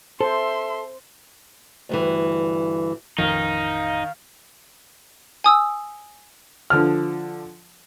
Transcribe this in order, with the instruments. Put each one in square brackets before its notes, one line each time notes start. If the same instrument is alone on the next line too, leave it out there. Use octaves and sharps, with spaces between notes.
[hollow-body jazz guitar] A4 [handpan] C5 [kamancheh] E5 C6
[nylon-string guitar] D2 G2 E3
[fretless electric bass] A1 F2 F3 [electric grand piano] D#3 [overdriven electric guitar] D#4 [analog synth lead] F5
[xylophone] G#5 D#6 E6
[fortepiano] D3 F3 F6